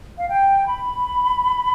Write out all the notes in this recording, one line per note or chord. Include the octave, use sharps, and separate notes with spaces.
F5
G5
B5